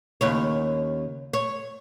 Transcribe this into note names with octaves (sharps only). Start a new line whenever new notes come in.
D#2 C#3 C#5
C#5